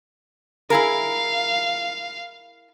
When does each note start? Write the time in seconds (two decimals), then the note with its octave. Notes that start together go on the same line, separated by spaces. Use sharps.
0.70 E4 G#4 A#4 F5